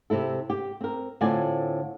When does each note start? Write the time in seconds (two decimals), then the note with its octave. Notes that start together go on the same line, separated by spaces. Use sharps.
0.10 C3 C4 E4 A4
0.50 G4
0.81 C4 A#4
1.21 A2 D3 C4 F4 D5 G#5